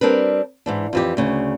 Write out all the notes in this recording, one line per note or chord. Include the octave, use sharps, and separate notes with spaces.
G3 C4 D4 A#4 B4
G#2 E3 D4
F2 E3 G4
D2 C#3